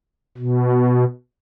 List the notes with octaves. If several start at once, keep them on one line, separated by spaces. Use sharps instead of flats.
B2